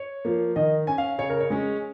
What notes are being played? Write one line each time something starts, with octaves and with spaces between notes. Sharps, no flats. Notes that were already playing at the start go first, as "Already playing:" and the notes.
Already playing: C#5
F3 A#3
D#3 D#5
C#4 G#5
F5
C#3 C#5
A#4
C#5
G#3 C#4